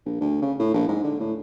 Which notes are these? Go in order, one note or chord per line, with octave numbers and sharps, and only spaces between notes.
A#1
D2
C#3
A2
A#1
G#2
D3
A2